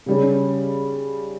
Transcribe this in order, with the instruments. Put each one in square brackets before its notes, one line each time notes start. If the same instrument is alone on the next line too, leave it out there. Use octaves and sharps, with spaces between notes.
[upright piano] C#3 G3 C#4